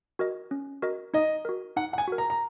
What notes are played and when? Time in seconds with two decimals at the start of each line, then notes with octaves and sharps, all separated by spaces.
0.19 F#4 A#4 D#5
0.51 C#4
0.82 F#4 A#4 D#5
1.14 D#4 D#5
1.45 F#4 A#4
1.76 D#4 F#5
1.93 F#5
1.98 G#5
2.08 F#4 A#4
2.18 A#5
2.30 A#5